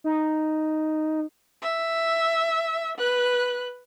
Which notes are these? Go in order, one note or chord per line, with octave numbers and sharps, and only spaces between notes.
D#4
E5
B4 F#6